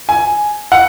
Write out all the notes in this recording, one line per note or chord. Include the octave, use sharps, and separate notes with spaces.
G#5
F#5